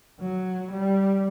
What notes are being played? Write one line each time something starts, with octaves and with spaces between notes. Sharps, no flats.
F#3
G3